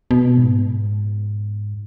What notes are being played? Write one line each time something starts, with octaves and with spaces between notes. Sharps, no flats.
B2
G#2